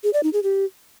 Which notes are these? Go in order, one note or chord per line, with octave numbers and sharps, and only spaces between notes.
G#4
D5
D#4
G#4
G4